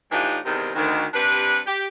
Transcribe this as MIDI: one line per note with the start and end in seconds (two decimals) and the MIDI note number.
0.12 0.38 45
0.12 0.38 52
0.12 0.38 62
0.12 0.38 63
0.12 0.38 65
0.12 0.38 67
0.45 0.71 40
0.45 0.71 44
0.45 0.71 48
0.45 0.71 51
0.75 1.05 38
0.75 1.05 51
1.14 1.60 48
1.14 1.60 55
1.14 1.60 62
1.14 1.60 71
1.66 1.87 67